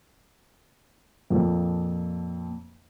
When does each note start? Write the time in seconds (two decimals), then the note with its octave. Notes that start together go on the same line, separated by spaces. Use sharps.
1.30 F2 A#2 F3 A#3